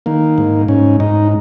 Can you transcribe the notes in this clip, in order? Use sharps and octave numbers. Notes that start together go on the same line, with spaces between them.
D#3 A#3
G#2
G#2 C#4
G#2 D#4